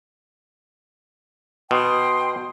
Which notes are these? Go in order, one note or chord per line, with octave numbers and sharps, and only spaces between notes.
B2 G5 C6 D#6